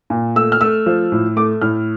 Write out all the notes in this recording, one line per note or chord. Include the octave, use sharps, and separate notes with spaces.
A#2
A3 E6
F6
A3 E6
F3
A2
A3 D6
A2 F6